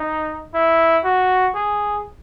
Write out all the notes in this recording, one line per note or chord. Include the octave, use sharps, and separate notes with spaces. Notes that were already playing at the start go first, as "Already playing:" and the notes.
Already playing: D#4
E4
F#4
G#4